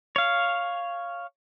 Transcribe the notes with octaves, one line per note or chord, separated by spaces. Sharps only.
C#5 F5